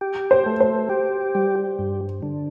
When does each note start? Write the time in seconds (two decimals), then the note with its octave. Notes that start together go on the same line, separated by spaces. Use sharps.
0.01 G4
0.31 C5
0.46 A3
0.60 C5
0.90 G4
1.35 G3
1.79 G2
2.23 D3